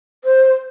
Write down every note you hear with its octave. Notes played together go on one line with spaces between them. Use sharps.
C5